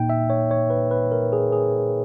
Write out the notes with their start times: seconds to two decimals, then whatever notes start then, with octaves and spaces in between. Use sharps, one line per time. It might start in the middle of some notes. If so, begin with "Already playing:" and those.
Already playing: A#2 A#3 D#4 G5
0.10 E5
0.30 C#5
0.51 C#5
0.70 B4
0.91 B4
1.12 A#4
1.33 G#4
1.52 G#4